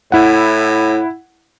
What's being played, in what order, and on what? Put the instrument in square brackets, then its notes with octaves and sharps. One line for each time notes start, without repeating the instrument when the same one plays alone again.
[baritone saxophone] A2 [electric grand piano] E4 F#5